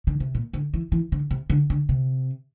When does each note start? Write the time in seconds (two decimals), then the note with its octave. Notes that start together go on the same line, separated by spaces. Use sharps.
0.07 D3
0.20 C3
0.35 A#2
0.53 D3
0.74 E3
0.92 E3
1.12 D3
1.31 C3
1.50 D3
1.70 D3
1.89 C3